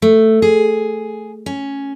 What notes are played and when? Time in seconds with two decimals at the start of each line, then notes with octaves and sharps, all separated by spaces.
0.02 A3
0.42 G#4
1.46 C#4